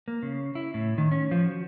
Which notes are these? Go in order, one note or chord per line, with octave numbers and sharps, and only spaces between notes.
A#3
C#3
E4
A2
D#3
C#4
F3
F#4